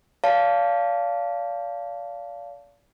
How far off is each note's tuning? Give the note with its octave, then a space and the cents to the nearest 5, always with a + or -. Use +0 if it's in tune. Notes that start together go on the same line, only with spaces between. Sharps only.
D5 -35 F5 -5 A5 +0